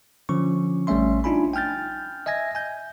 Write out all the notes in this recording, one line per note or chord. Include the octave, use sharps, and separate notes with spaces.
D3 F3 C#4 C#6
A1 G3 A3 C#4 E5 C6
D4 D#4 F4 G#5 B5
G5 G#5 F6 G6 A6
D#5 E5 G#5 G#6 A#6
G#5 G6